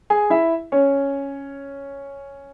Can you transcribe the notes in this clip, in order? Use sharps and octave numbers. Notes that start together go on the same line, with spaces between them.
G#4 G#5
E4 E5
C#4 C#5